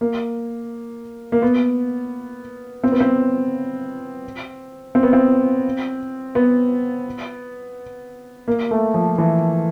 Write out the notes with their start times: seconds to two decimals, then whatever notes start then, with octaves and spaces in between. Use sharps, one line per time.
0.01 A#3
1.32 A#3
1.42 B3
2.84 C4
2.92 B3
3.00 C4
4.95 C4
5.03 B3
5.13 C4
6.35 B3
8.48 A#3
8.71 A3
8.94 F3
9.18 E3